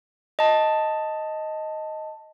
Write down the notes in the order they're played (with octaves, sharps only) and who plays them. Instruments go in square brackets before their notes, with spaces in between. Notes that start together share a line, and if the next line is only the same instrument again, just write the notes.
[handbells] D#5 A5